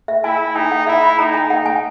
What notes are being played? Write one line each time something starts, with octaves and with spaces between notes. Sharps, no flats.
E5
E4 G#5
D#4 G#5
F#5
E4 E5
B5
D#4 A#5
G#5
F#5
G#5